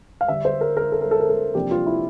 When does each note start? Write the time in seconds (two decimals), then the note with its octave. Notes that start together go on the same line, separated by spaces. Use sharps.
0.21 F5
0.28 D3 G3 D4 E5
0.45 C5
0.61 A#4
0.77 A#4
0.92 A4
1.01 A#4
1.11 A4
1.20 A#4
1.30 A4
1.55 C3 F3 A#3 D4 G4
1.71 F4
1.87 E4